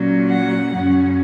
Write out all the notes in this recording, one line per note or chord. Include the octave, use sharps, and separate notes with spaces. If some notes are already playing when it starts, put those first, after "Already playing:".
Already playing: A#2 F#3 C#4
F#5
F#2 C#3 F#3 C#4